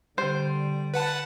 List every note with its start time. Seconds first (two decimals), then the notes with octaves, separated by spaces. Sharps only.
0.18 D3 G3 C5
0.94 B4 F#5 A5